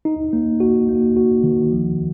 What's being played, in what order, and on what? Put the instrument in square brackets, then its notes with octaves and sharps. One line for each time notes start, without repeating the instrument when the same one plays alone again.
[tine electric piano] D#4
A#3
F#4
A#3
F#4
D#3
F3